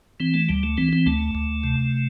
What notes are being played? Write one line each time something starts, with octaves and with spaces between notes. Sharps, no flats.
E3 C4
A3
D2 G3
A3
E3 C4
C4
D2 A3
D2
C3